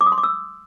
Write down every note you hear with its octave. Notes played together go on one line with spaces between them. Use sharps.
D6
D#6
C6
D6
E6